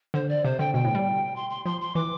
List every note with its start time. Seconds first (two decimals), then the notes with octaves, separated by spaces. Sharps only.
0.14 D3 C5
0.29 D5
0.44 C3 C5
0.59 D3 G5
0.74 B2 G5
0.85 A2
0.95 G3
1.36 C6
1.50 C6
1.65 F3 C6
1.81 C6
1.95 E3 D6